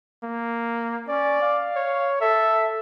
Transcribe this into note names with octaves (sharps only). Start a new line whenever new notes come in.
A#3
C#4 D5
F5
C#5
A4 E5